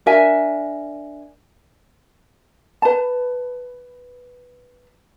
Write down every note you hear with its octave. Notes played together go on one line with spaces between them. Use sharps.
D4 A#4 E5 G#5
B4 A5